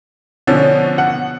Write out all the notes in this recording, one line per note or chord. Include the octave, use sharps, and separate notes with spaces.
B2 D3 F3 C#4
F#5